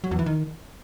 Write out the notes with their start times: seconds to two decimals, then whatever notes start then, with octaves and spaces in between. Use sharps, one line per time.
0.04 F#3
0.11 E2
0.19 E3
0.26 D#3